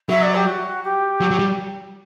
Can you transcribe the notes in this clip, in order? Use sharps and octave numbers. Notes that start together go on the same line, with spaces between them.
F#3 E5
D5
G4
F#4
G4
F#3
F#3
G3